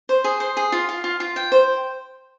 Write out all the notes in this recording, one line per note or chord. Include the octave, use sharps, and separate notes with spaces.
C5
G#4
C5
G#4
F4
F4
F4
F4
G5
C5